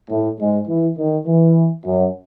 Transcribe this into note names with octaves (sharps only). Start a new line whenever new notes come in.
A2 A3
G#2 G#3
E3
D#3
E3
F#2 F#3